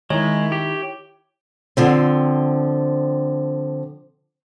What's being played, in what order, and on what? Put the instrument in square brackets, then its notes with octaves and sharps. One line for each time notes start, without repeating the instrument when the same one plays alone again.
[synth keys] D#3 [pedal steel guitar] G#3 [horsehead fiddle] E4 [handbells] C#5
[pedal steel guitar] G4
[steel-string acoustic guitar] D3 F3 C4